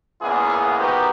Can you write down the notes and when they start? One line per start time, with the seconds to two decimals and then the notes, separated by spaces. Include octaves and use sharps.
0.22 C#2 A#2 G#3 B3 E4 G#4
0.80 B3 D#4 F#4 G4 A#4 C5